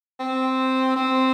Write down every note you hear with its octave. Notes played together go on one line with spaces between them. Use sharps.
C4
C4